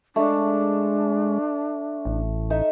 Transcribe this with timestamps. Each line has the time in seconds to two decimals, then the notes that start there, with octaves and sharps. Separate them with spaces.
0.16 G#3 A3 D4
2.05 A1
2.50 D#4 A4 E5